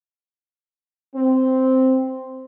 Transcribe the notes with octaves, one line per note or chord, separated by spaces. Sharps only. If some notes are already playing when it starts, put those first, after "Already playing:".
C4